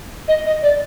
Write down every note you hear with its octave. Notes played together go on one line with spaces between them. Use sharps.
D#5
D#5
D5